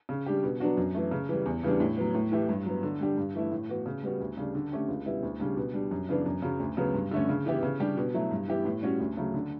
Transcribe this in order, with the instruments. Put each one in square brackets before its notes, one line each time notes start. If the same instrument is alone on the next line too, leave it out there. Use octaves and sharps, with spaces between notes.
[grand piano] C#3
G3 D4 G4
B2
F#3 B3 D4 F#4
F#2
E3 A3
C#3
E3 G3
E2
C#3 E3 G3 D4
A2
F#3 B3
A2
E3 A3 E4 G4
G2
F#3 B3
D3
G3 D4 G4
G2
E3 A3 E4
A2
E3 B3 F#4
C#3
G3 B3 F#4
D2
C#3 G3 D4
D3
A3 C#4 G4
C#2
B2 G3 B3 E4
D2
C#3 G3 D4
B2
G3 D4
F#2
C#3 E3 B3 D4
F#2
C#3 F#3
D2
C#3 F#3 B3
G2
D3 A3 C#4
C#3
E3 B3 E4 G4
C#3
G3 D4 G4
B2
F#3 A3 E4
G2
E3 B3 E4 G4
A2
G3 C#4 F#4
D2
C#3 F#3 A3
D3